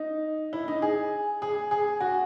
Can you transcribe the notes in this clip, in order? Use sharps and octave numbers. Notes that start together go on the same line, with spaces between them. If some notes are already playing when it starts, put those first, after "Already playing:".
Already playing: D#4
E4
D#4
G#4
G#4
G#4
F#4